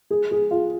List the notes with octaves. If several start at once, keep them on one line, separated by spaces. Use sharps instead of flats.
G#4
G#4
F4